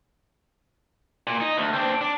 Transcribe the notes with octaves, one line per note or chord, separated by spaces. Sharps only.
A#2
D#4
D2
C4 D4
D4